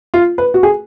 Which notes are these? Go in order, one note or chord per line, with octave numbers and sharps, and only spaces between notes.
F4
B4
F#4
G#4